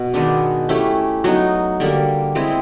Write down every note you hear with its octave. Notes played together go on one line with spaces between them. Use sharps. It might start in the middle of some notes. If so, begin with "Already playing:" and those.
Already playing: B2
D#3 G#3 B3 D4
A3 C#4 E4 G4
F#3 B3 D#4
D3 G3 A#3
G#3 C4 E4 G#4